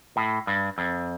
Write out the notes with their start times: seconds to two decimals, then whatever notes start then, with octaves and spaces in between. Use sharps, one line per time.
0.17 A2
0.47 G2
0.78 F2